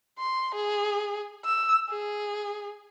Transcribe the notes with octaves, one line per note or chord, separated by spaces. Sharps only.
C6
G#4
E6
G#4